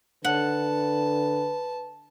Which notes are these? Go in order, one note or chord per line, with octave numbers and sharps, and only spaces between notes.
D3 B4 F#5 A5